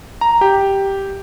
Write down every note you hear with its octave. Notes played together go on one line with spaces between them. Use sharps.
A#5
G4